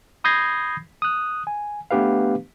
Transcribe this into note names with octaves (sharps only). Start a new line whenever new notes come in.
B5 D#6 G6 G#6 A#6 C7
D#6 F#6
G#5
A3 B3 D4 G4 B4 F5